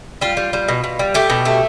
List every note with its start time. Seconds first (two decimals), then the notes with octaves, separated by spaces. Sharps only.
0.21 G3 F4
0.37 G3
0.53 G3
0.68 B2
0.84 B2
0.99 G3
1.14 A3 G4
1.30 B2
1.45 A3